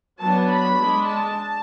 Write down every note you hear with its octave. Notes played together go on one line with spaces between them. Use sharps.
F#3 B3 D4 A5
B5
G#3 D4
A5